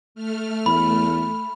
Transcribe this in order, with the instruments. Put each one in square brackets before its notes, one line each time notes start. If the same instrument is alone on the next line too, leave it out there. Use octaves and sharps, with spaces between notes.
[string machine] A3 F6
[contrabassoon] E2 [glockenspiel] B5